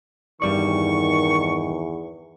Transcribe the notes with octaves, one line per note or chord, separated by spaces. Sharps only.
E2 G2 D#3 G3 D5 C#6